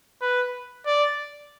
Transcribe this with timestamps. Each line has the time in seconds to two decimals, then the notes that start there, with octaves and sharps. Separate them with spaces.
0.22 B4
0.86 D5